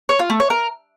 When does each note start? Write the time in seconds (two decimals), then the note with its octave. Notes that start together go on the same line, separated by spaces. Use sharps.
0.09 C#5
0.19 F4
0.30 A3
0.40 C#5
0.50 A#4